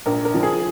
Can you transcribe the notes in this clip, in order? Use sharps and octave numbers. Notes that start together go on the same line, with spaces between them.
A#1 A#4
A#4
F3
G#4